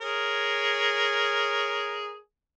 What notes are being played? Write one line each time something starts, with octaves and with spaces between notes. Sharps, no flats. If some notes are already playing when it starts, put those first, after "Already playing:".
G#4 A#4 C#5